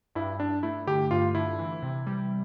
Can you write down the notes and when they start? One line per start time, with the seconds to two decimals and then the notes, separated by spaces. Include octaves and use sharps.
0.15 G2 E4
0.40 G2 D4
0.63 A3 E4
0.87 D3 G4
1.11 G2 F4
1.35 D3 E4
1.59 E3
1.83 C3
2.07 G3